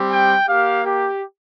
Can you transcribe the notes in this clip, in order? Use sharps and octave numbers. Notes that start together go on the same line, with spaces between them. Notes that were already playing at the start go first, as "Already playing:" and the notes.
Already playing: G3 C4 G4
G5
A#3 G4 F5
G4